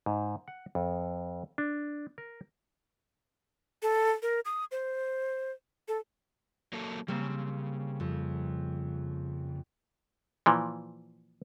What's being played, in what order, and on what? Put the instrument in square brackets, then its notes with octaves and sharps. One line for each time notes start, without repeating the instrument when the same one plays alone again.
[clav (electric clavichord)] G#2
F#5
F2
D4
A#4
[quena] A4
A#4
D#6
C5
A4
[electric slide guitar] F#3 A#3 A4
[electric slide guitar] C#3 [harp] G3 A#3 C4
[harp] F2
[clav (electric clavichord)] A#2 E3 F3